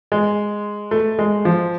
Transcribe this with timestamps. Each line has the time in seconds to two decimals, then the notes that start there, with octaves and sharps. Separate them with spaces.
0.12 G#3
0.91 A3
1.19 G#3
1.45 F3